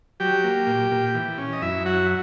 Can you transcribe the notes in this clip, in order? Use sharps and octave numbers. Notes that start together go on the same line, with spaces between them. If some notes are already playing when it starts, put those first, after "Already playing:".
F#3 G4 G5
A#3
A#2
A#2
E3
C#4
D#5
F#2 E4 E5
F#3 F#4 F#5